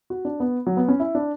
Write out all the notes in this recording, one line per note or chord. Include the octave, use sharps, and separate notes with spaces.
F#4
D4
B3
F#3
B3
C#4
E4
D4